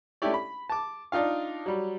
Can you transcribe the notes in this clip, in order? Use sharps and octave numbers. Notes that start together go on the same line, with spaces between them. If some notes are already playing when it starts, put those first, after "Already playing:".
A3 C#4 D4 E4 G4 D5
B5
A5 D6
D4 D#4 F4 F5
F#3 G3